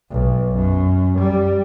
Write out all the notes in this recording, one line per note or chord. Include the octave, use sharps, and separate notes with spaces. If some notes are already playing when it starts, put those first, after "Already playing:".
B1
F#2
G3